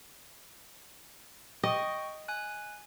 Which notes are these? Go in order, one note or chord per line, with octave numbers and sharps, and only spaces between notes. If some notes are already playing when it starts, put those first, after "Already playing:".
D#5 G5 C#6 D#6
G#5 F#6